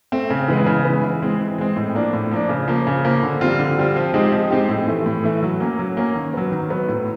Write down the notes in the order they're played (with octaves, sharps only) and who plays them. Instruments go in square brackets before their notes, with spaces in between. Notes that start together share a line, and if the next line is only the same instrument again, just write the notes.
[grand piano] A3 C4
C#3
E3 G#3 B3
C#3
E3 G#3 B3
E3
G#3 C4
E3
G#3 C4
A2
F3 A#3 D4
A2
F3 A#3 D4
C#3
F3 A#3
C#3
F3 A#3
D3
G3 C4 F4
D3
G3 C4 F4
F3
G#3 C4 D#4 G4
F3
G#3 C4 D#4 G4
A2
E3 A3
A2
E3 A3
F#3
A#3 C#4
F#3
A#3 C#4
D#3
F#3 B3
D#3
F#3 B3
A2